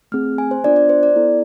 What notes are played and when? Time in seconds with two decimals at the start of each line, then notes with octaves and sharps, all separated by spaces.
0.12 A3 C4 G#4 F6
0.38 G#5
0.51 C5
0.64 B3 D4 F4 D5
0.76 D5
0.89 C5
1.03 D5
1.16 B3 E4 A4